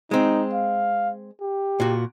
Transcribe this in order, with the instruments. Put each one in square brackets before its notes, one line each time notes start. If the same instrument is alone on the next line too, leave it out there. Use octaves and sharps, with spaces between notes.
[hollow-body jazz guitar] G#3 C4 [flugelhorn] D#4
[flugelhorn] F5
G4
[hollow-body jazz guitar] A#2 F#4